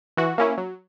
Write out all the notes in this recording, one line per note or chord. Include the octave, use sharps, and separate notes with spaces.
E3 F#4
A#3 C#4 E4
F#3